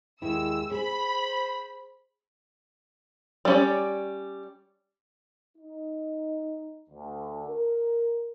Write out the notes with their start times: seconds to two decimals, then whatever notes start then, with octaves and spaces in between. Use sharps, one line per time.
0.22 D#2 G#3 E4 E6
0.71 G#4 C5 B5
3.45 G3 C#4 D5
5.57 D#4
6.90 D2
7.47 A#4